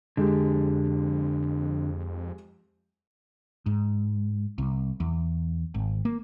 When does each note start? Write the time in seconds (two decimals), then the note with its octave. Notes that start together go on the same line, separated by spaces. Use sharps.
0.17 F2 D3 G#3 G4
3.66 G#2
4.58 C2
5.00 E2
5.74 G#1
6.05 A#3